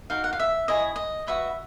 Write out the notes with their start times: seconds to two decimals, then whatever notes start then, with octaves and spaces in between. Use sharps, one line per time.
0.10 D#4 F#4 A#4 F5
0.24 F#5
0.33 F5
0.40 E5
0.68 E4 G#4 C#5 D#5
0.96 D#5
1.27 F#4 B4 D#5 E5